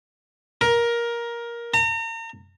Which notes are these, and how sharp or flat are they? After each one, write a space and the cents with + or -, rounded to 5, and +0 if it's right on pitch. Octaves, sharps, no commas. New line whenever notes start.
A#4 +15
A#5 -40